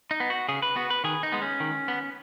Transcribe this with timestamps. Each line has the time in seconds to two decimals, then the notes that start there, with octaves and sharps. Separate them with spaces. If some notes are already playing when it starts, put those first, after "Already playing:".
0.11 D#4
0.20 B3
0.30 F#4
0.49 C#3 G#4
0.62 B4
0.76 B3 F#4
0.90 B4
1.04 D#3 G#4
1.23 D#4
1.32 G#3 B3
1.42 C#4
1.60 D#3
1.88 B3